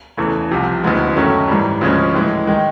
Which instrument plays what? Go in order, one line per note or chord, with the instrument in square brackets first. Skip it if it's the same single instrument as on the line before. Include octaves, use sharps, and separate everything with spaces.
[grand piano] E2 C#3 E3 A3
C2 C3 F3
D2 C#3 E3 G#3 B3
F#2 D#3 F#3 A3 C#4
G#2 E3 G3
D2 C#3 F3 G#3 C#4
A2 E3 G#3
D#3 G#3